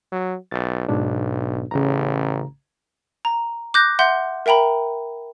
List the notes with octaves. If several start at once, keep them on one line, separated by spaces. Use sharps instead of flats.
F#3
B1 A6
B1 G#2 B2 D4
A1 C#3 A#5
A#5
D6 F#6 G6 A#6
E5 F#5 C6 G6
A#4 E5 G5 A#5 B5